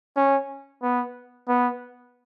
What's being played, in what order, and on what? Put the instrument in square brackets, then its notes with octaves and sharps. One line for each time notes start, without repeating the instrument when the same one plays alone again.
[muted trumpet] C#4
B3
B3